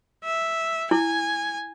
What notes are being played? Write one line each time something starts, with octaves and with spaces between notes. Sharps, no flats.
E5
E4 G#5